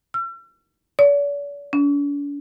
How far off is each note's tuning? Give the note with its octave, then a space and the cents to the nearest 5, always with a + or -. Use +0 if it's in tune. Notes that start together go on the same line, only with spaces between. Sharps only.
E6 +45
D5 -45
D4 -45